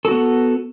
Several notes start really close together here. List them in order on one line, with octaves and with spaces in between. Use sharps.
A4 F#4 B3